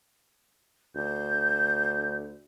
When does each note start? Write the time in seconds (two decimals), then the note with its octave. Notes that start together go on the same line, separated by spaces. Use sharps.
0.96 D2 G6